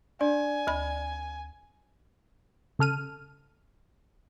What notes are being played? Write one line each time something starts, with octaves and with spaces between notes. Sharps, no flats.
D4 D5 G#5
D2 B5
C#3 A4 F6 D#7